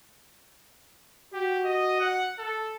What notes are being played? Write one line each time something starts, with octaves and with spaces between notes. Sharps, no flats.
F#4 G4
D#5
F#5
A4